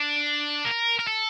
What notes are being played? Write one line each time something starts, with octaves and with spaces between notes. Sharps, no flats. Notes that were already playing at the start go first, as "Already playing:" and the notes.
Already playing: D4
A#4
A#4
A4